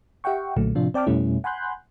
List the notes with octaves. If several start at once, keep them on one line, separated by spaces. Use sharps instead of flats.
G4 E5 F#5 G5 C#6
B1 A#2 D3 F#3 A3
A2 C3 F3 D4 F4
C4 D5 G5 A5 D6 F6
F2 B2 G3 A3 C#4 E4
F#5 G#5 B5 C6 F#6 G6